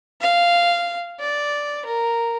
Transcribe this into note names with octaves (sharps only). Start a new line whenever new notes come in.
F5
D5
A#4